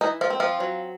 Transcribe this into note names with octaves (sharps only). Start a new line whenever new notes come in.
E3 D#4
F3 F4
C4
F3 F4
F#3